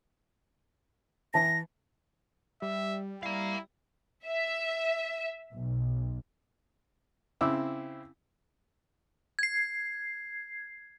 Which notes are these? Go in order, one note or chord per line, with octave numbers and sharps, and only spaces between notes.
E3 A5 A#6
G3 E5
E4 F5 A#5
E5
B1
C#3 C4 E4 D6 E6
G#6 C7